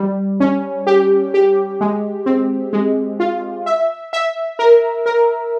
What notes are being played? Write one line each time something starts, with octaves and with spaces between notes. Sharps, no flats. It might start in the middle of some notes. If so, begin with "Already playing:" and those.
Already playing: G3
C#4
G4
G4
G#3
C4
G#3
F4
E5
E5
A#4
A#4